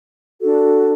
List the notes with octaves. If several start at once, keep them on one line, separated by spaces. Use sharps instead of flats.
D4 F#4 A4